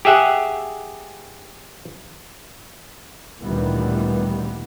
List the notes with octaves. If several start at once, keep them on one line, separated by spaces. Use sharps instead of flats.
G4 G#4 E5 F#5
D2 A#2 D#3 E3 G3 B3